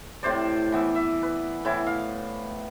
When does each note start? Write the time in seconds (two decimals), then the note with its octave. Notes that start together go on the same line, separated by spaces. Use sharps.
0.23 A2 C3 C5 D5
0.72 E3 B3 E5
0.95 E5
1.23 B4
1.65 A2 E3 E4
1.86 F5